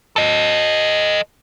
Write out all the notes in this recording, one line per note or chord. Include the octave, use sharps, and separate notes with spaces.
A4 D#5